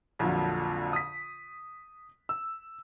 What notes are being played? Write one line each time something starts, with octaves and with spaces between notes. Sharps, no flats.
A#1 F2 A#2 D3 F#3
D#6 B6
E6